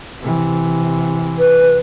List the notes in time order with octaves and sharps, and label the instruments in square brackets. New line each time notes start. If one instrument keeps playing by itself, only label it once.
[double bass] C3 E3
[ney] B4